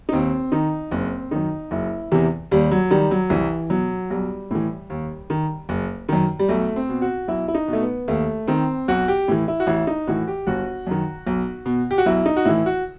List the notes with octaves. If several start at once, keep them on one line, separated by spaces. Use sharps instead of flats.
D#4
D#2 C4
D#3 D#4
F#1 C4
F#2 D#3 D#4
F#1 E4
E2 C3 E3
D#2 G3
F#3
D#3 G3
F#3
C2 E3
B2 F#3
B1 G3
A2 E3
D#2
D#3
F#1
F#2 D#3
G3
B1 A3
C4
B2
F#4
B1 E4
E4
D#4
B2
A3
B3
D#2 A3
D#3 C4
B1 F#4
G4
A2 E3
E4
F#4
A1 E4
D#4
A2 E3 F#4
G4
G1 F#4
F#2 D#3
B1
B2
G4
F#4
B1 E4
D#4
F#4
A2 E3 E4
F#4